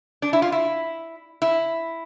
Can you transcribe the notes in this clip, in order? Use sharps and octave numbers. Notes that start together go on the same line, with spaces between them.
D4
E4
F4
E4
E4